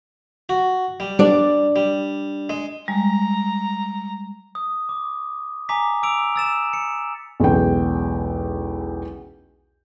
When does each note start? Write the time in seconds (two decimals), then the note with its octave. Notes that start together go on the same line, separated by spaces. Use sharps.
0.49 F#4
1.00 G3
1.19 D4 D5
1.76 G3
2.50 G#3
2.88 G3 G#3 A#5
4.55 D#6
4.89 D6
5.69 G#5 A#5 D6 B6
6.03 D6 E6 D7 F7
6.36 E6 A6 E7
6.73 C#7
7.40 B1 E2 C#3 G#3 G5